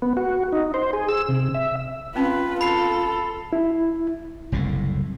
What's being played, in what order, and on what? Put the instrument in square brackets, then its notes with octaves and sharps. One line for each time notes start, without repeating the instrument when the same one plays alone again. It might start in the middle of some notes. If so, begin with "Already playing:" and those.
[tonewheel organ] B3
F#4
D#4
C5
G#4
E6
C3
E5
[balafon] C4 C#4 A5 [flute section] F4 [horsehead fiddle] B4
[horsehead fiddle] A4 [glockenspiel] B5 C7
[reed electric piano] E4
[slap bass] F#1 C2 A2